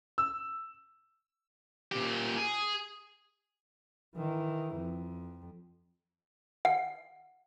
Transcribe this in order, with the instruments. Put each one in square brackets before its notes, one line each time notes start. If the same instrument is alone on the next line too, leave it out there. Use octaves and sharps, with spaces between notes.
[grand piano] E6
[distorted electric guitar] A#2 G4
G#4
[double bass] D#3 E3
F2
[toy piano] F#5